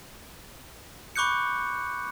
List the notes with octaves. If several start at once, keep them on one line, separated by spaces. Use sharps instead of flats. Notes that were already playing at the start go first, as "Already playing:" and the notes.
B5 C#6 D6 F#6 G6 C#7